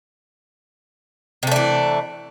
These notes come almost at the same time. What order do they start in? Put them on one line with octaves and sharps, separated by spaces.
C3 A3 D4 E3